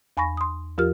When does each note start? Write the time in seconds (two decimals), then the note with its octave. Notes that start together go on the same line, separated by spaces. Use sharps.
0.17 E2 G#5 B5 C#6 A#6
0.37 C6 D#6
0.78 E2 F3 F4 G4 A#4 F6